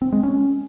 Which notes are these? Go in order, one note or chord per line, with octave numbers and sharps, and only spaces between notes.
C4
G#3
C#4